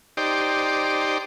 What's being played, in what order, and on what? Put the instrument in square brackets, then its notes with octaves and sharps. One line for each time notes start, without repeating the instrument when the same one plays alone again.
[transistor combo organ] D#4 G4 C5 D5